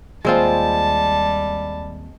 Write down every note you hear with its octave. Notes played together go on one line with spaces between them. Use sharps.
D#2 G3 G#3 C4 F4 A5